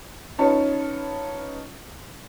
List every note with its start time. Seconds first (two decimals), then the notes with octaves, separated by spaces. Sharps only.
0.38 C#4 D#4 F4 B4 C#5 A5